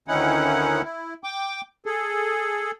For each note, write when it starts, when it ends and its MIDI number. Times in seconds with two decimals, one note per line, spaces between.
0.08 0.82 38
0.08 0.82 51
0.08 0.82 61
0.08 0.82 63
0.08 0.82 64
0.08 0.82 78
0.84 1.14 64
1.24 1.61 79
1.24 1.61 86
1.86 2.71 68
1.86 2.71 69